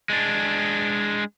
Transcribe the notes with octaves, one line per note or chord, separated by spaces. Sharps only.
G#3 D4